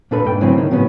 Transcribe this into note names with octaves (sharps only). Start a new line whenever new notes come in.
A#2 D4 A4 B4 B5
G#2 G5
C#3 E3 F#3 A3 C4 C#4
D#3
A2 C#3 F#3 B3 C#4